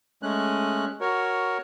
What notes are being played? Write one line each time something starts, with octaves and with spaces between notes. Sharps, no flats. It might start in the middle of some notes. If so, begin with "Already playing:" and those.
G#3 A3 C#4 F#6
F#4 A#4 C#5